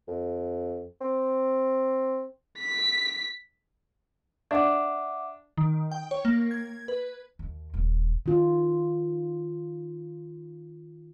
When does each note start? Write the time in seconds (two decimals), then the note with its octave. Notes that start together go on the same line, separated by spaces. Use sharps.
0.08 F2
1.01 C4
2.59 B6
4.51 D4 E5 F#5 D6
5.57 D#3
5.92 G5
6.11 C#5
6.25 A#3
6.51 G#6
6.88 B4
7.39 D#2
7.74 D#1
8.26 D#3 F4